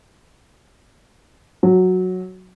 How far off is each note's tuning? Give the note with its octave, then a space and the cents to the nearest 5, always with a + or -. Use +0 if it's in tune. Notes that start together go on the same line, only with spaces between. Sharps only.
F#3 -5